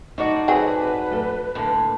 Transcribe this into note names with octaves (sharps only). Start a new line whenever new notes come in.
A2 D#4 F#4 D5
F#3 C4 G#4 B4
A3 A4
A2 D3 A#3